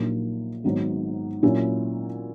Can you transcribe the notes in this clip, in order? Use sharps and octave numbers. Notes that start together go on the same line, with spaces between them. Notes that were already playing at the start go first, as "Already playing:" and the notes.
Already playing: A#1 A#2 F#3 A#3 D#4
G#1 G#2 F#3 B3
A#2 F#3 C#4 E4